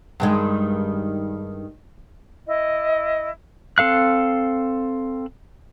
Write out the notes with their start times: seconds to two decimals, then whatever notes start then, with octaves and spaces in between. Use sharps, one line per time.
0.20 G2 D#3 G#3
2.47 E4 D#5
3.78 C4 A4 F5 F#6